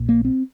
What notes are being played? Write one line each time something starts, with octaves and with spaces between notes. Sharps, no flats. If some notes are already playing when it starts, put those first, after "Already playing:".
Already playing: A#1 A#2
A#3
C4